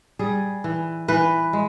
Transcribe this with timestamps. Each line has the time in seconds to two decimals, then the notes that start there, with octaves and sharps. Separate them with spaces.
0.19 G3 G#4
0.64 E3
1.08 E3 B4
1.53 G#3